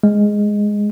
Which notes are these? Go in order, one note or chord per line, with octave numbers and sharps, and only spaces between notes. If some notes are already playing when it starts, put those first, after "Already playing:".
G#3